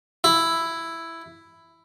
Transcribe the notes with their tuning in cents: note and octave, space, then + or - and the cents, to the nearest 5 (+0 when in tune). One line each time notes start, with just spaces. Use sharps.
E4 +5